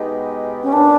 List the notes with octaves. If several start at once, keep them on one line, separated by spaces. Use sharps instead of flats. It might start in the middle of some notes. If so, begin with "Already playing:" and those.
Already playing: B2 G#3 B3 D#4 G4
C#4
A#2 G3 B3 D4